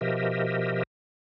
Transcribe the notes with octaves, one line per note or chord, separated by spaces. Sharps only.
B2 F3 G4 A#4 D#5 E5